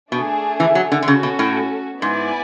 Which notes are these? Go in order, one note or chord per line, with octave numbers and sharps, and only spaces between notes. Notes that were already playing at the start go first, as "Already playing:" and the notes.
B2 A3 D4 G#4
E3
F#3
D3
D3
C#3 C#4 F#4 A4
B2
A2
G#2 B3 E4 B4 D5 G#5